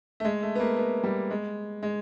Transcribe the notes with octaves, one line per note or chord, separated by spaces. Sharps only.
A3
G#3
A3
B3
A#3
B3
G3
G#3
G#3